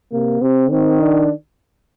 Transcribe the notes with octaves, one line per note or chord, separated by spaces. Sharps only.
C3 A#3
C3 C4
D#3 C4
D4